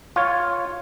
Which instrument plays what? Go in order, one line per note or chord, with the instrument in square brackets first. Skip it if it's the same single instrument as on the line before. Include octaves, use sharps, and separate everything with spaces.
[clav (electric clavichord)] F4 C#5